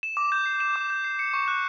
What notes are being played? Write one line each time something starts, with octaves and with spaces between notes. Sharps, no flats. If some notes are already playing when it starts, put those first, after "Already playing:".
E7
D6
G6
C7
E7
D6
G6
C7
C#7
C#6
F#6